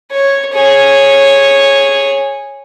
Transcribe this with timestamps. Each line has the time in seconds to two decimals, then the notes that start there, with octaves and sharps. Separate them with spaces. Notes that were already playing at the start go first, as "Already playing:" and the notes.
0.12 C#5
0.53 G#4 C#5